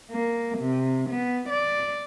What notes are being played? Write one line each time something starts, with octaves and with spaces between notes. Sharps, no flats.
A#3
C3
B3
D5